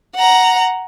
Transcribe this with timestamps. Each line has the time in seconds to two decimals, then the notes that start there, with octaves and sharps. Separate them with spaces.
0.15 F#5 A#5